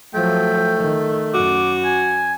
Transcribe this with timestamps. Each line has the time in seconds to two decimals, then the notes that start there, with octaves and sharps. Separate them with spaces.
0.14 F3 F#3 A3 G5
0.78 D#3
1.34 F#2 F#4 D6
1.85 G#5